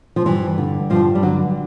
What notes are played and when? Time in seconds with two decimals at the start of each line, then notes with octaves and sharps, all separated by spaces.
0.16 F3
0.26 G2 E3
0.58 D3
0.90 G2 F3
1.15 G3
1.23 D3 F#3